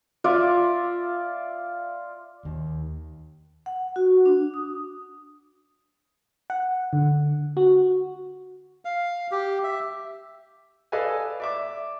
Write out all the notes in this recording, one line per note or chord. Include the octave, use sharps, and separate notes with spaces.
F4 D5 E5
D#2
F#5
F#4
D4
D#6
F#5
D3
F#4
F5
G4
E5
A4 B4 D5 D#5 F5 G#5
D5 E5 D6